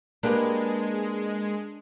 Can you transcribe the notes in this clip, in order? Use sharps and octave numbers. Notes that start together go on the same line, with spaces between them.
G#3 A#3 D4 G4 B4